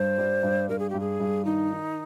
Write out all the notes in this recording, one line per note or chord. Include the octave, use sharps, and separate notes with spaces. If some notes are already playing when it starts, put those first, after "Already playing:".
Already playing: G2 C5
G3
G2
G2 A#4
G#4
G2 G4
G#4
G2
D#3 D#4
D#3